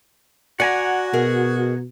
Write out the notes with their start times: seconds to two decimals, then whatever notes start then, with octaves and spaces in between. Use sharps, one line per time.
0.60 F#4 D5 F#5 G#5 A#5
1.13 B2 G#4 A#4 D#5